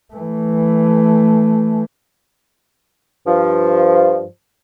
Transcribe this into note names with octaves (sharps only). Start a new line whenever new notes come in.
E3 A3
G2 F3